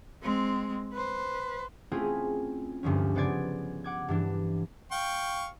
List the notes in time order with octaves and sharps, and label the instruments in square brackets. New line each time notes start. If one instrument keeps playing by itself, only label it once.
[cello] G#3 C4
B4 C5
[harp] A3 C4 C#4 E4 F4 G#4
D2 G2 D3 F3 C#4
C#3 B3 C5 D5 G#6
F#5 D6 G#6
G2 E3 D4
[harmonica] F5 G5 C#6